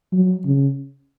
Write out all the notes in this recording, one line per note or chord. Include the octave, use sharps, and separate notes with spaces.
F#3
C#3